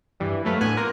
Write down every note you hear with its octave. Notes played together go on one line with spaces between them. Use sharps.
G2 E3 G3
F#3 A3 B4 F5
A2 D3 B3 G#5 F#6
A#3 F4 A#4